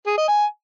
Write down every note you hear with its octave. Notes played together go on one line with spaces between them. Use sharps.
G#4
D#5
G#5